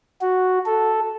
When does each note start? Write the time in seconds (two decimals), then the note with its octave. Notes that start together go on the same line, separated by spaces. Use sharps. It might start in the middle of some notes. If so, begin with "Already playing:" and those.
0.21 F#4
0.66 A4